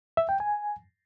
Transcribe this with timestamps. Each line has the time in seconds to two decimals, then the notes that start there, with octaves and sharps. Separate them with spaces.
0.17 E5
0.29 G5
0.40 G#5